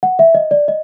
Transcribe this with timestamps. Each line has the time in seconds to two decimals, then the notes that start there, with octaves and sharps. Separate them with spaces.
0.03 F#5
0.19 E5
0.35 D#5
0.51 D5
0.68 D#5